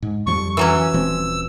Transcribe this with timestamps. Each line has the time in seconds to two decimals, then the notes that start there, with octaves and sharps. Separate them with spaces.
0.02 G#2
0.27 F2 F3 G3 C#6
0.57 E3 F#3 C#4 E6
0.93 D#1 F3 C4